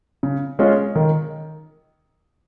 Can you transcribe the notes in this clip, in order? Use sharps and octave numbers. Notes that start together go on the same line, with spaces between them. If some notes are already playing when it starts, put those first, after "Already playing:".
C#3
G#3 C#4 F4 G#4
D#3